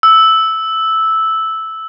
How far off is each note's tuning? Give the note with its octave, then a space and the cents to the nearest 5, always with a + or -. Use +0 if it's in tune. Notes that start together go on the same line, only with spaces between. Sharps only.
E6 -5